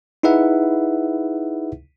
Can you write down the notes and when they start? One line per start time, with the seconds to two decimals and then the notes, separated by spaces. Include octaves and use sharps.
0.23 D#4 E4 G#4 B4 E5 F#5